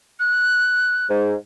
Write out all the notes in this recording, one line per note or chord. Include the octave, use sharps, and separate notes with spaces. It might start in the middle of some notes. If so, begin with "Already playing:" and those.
F#6
G#2